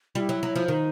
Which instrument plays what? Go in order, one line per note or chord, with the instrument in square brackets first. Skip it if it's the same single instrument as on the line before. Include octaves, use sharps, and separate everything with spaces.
[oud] G3 [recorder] F4
[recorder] E4
[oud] F#3
F#3
F3
[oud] D#3 [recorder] D#4